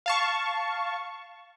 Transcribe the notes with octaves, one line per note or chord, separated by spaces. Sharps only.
F5 A5 C#6